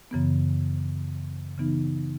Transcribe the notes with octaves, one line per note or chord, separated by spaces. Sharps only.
F#2 C#3 E3 B3
C#3 E3 B3 D#4